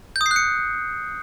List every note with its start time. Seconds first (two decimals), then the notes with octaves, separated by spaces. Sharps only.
0.16 G6
0.21 D#6
0.26 C7
0.31 F#6
0.36 C#7